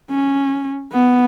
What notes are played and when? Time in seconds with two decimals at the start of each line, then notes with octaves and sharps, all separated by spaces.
0.11 C#4
0.93 B3